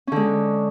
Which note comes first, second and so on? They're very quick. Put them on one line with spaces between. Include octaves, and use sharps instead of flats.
C#4 D3 G#3